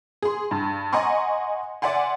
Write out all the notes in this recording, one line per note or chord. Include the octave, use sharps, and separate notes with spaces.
G#4 C6
G2
D#5 F#5 G#5 A#5 C6 C#6
D5 E5 F#5 G#5 C6